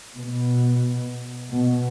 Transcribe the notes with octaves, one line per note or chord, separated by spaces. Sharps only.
B2
B2